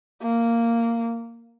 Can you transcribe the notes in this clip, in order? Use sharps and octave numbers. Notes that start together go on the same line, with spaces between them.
A#3